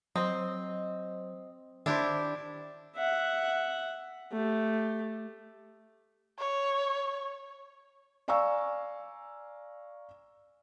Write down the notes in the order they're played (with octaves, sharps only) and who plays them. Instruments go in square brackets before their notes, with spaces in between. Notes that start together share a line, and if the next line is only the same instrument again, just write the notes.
[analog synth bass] F#3 [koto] C4 [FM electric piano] C5 D#5
[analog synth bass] D#3 [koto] D4 E4 G4 [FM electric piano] C5 E5
[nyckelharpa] E5 F#5
A3 G4
[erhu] C#5
[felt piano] D5 F5 G#5 A#5 C#6 E6